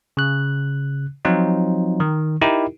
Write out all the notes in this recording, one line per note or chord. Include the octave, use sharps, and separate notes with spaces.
C#3 F#6
F3 F#3 C4 D#4 F4
D#3
D#4 E4 G4 A#4